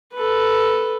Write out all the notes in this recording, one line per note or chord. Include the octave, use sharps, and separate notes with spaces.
A4 B4